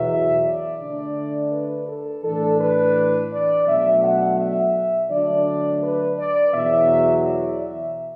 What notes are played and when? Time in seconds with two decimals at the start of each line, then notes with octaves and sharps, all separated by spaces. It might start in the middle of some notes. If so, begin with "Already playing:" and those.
Already playing: E2 B2 F#3 E5
0.45 D5
0.80 D3 A3 D4
1.52 B4
1.88 A4
2.23 A2 E3 D4 A4
2.60 B4
3.31 D5
3.67 B2 F#3 A3 D4 E5
4.03 F#5
4.39 E5
5.10 D3 F#3 A3 D4 D5
5.81 B4
6.18 D5
6.53 E2 B2 F#3 E5
7.25 D5
7.60 E5